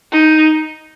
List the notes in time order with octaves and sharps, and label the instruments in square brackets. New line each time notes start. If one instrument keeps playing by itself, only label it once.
[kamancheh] D#4